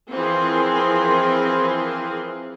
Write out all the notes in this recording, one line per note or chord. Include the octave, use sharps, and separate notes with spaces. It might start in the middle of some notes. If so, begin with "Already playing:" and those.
E3 F3 C4 G#4 A#4 C6